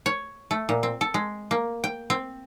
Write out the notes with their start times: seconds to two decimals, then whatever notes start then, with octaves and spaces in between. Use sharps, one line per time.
0.06 C#5
0.51 A3
0.69 A#2
0.83 C4
1.01 A4
1.14 G#3
1.51 A#3
1.84 G5
2.10 C4